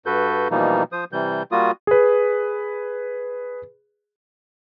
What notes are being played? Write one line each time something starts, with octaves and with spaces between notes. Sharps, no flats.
G2 F#4 A4 B4 G6
B2 E3 F3 G3 A#3 D#4
F3 C5 D#6
C3 E3 G3 G6
G3 A#3 F4 F#4 D#6
G#4 B4